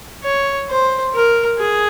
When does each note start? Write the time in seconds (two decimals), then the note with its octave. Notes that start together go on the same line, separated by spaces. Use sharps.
0.24 C#5
0.69 C5
1.14 A#4
1.59 G#4